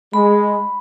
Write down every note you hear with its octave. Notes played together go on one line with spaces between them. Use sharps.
G#3 B5